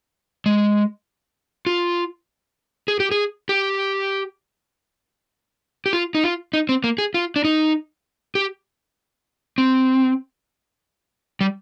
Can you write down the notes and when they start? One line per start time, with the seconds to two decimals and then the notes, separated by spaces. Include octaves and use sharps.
0.46 G#3
1.66 F4
2.88 G#4
3.00 G4
3.11 G#4
3.49 G4
5.86 G4
5.93 F4
6.15 D#4
6.24 F4
6.53 D#4
6.69 C4
6.84 A#3
6.98 G#4
7.14 F4
7.36 D4
7.44 D#4
8.35 G4
9.58 C4
11.41 G3